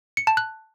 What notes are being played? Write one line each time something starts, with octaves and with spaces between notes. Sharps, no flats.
C#7
A5
F#6